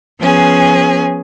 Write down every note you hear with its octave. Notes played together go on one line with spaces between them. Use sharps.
F3 B3 C#4 G#4